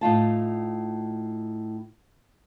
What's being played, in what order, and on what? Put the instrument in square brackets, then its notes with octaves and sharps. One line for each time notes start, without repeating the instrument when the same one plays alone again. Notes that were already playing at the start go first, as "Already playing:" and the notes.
[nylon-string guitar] A2 D#4 F4 A5